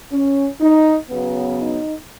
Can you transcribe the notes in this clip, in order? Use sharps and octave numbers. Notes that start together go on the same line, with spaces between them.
C#4
D#4
C#3 F#3 B3
D#4